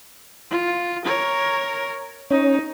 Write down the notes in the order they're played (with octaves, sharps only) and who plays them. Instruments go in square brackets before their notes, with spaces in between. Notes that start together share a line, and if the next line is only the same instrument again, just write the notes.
[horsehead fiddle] F4
A#4 C#5
[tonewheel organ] C#4 [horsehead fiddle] D#4